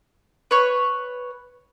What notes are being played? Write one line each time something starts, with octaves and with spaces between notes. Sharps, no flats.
B4 C#5